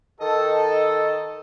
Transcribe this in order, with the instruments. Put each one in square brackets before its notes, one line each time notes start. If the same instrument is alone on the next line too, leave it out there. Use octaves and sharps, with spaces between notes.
[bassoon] D#3 [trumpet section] A4 [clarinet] D#5